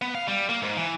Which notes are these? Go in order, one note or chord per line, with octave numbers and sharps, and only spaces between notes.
B3
F5
G3
A#3
G#2
E3